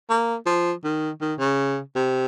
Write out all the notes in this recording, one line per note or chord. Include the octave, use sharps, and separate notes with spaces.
A#3
F3
D#3
D#3
C#3
C3